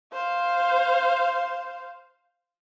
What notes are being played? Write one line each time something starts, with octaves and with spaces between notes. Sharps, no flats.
C5 F5